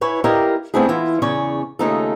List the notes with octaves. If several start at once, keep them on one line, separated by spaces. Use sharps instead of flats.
E4 B4 C#5 G#5
E4 G4 A#4 D5 D#5 F5
A3 B3 C4 D4 E4 G#4
E3 E4 F4
E2 C#3 C#4 C#5 D5
D#2 C#3 A3 D#4 F4 A4